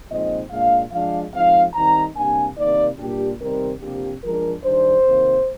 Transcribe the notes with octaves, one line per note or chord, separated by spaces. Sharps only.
A#2 F3 G#3 C4 D#4 D#5
A#2 G#3 D4 F5
F3 G#3 D4 F5
F3 G#3 C4 D#4 F5
D#3 G3 C4 D#4 A#5
C3 G3 A#3 D4 G#5
C3 D#3 A#3 D#4 D5
A#2 G3 D4 G4
C3 D#3 G3 C4 D#4 A#4
C3 F3 A#3 D4 G4
F3 G#3 D4 A#4
D#3 G3 D4 C5
C3 D#3 A#3